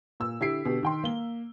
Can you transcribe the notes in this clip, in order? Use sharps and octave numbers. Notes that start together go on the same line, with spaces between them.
A#2 E6
D3 E4 G4 B6 C7 D7
B2 D3 G4
D#3 G5 C6
A#3 G7